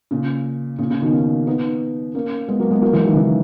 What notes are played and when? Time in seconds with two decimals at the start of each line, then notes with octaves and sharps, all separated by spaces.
0.11 A#2 C#3
0.79 A#2 C#3
0.90 A#2 C#3
1.02 B2 D#3
1.13 A#3 C#4
1.47 B3 D#4
2.15 A#3 C#4
2.48 G#3 B3
2.60 F#3 A#3
2.71 G#3 B3
2.82 F#3 A#3
2.93 E3 G#3
3.04 D#3 F#3
3.16 C#3 E3